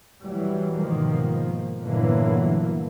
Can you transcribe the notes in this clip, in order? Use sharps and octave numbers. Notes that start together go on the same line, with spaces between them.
E3 F#3 G3
G#2 B2 D#3 F3 A#3
G1 A#2 D3 E3 F#3 A#3